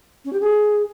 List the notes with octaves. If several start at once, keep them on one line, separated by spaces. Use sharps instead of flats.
C#4
G4
G#4